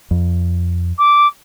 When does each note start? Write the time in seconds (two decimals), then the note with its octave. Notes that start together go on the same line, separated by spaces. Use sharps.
0.11 F2
0.98 D6